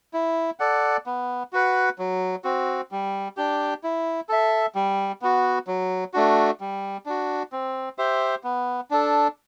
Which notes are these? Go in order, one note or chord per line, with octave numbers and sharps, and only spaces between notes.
E4
A4 D5 F#5
B3
F#4 B4 F#5
F#3
C4 F#4
G3
D4 G4
E4
A4 E5
G3
B3 F#4
F#3
A3 D4 F#4
G3
D4 F#4
C4
G4 C5 E5
B3
D4 A4